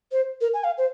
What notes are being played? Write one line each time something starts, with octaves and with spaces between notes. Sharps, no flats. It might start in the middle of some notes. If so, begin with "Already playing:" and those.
C5
A#4
G#5
F5
C5